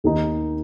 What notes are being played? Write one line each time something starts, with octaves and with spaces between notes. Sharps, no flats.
D#2 D#3 A#3 D#4